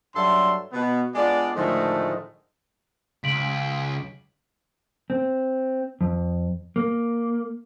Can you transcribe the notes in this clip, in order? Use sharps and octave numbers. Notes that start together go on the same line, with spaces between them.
G2 F#3 A4 D5 E5 C6
B2 B3
G#3 B3 D4 F4 D5
A2 D3 D#3 F3 G#3 A3
C#2 B6 D7 F#7
C4
F2
A#3